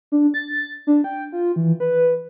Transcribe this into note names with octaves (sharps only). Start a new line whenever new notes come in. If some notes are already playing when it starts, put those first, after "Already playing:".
D4
A6
D4
G5
F4
E3
B4